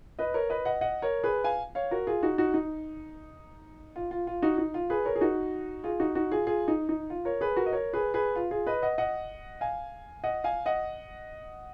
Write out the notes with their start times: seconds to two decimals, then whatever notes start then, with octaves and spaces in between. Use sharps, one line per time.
0.19 B4 D#5
0.34 A#4 C#5
0.50 B4 D#5
0.65 D#5 F#5
0.81 D#5 F#5
1.02 A#4 C#5
1.23 G#4 B4
1.44 F5 G#5
1.75 C#5 F5
1.91 F#4 A#4
2.07 F4 G#4
2.22 D#4 F#4
2.38 D#4 F#4
2.54 D#4
3.96 F4
4.11 F4
4.27 F4
4.42 D#4 F#4
4.58 D#4
4.74 F4
4.90 G#4 B4
5.05 A#4 C#5
5.16 G#4
5.21 D#4 F#4
5.84 F4 G#4
6.00 D#4 F#4
6.15 D#4 F#4
6.31 F4 G#4
6.47 F4 G#4
6.68 D#4
6.89 D#4
7.10 F4
7.25 A#4 C#5
7.41 G#4 B4
7.56 F#4 A#4
7.66 D#5
7.73 A#4 C#5
7.93 G#4 B4
8.14 G#4 B4
8.36 F4
8.51 F4 G#4
8.67 B4 D#5
8.82 D#5 F#5
8.98 D#5 F#5
9.61 F5 G#5
10.24 D#5 F#5
10.44 F5 G#5
10.66 D#5 F#5